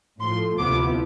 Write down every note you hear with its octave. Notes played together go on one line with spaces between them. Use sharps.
A2 F3 A3 C6
D2 C3 F3 B3 E4 D6